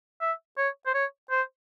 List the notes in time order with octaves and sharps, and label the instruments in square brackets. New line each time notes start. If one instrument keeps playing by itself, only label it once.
[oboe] E5
C#5
C5
C#5
C5